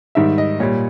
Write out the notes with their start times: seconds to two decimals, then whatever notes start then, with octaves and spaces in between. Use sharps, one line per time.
0.15 G#2 D#3 G3 E5
0.38 D#5
0.60 A#2 G3 C#5